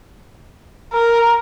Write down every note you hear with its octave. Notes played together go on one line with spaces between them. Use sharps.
A#4